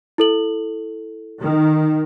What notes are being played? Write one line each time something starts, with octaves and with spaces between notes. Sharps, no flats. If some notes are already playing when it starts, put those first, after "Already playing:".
E4 A4 F#7
D#3